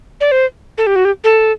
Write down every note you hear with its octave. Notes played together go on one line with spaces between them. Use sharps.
D5
C5
A4
G4
F#4
G4
A4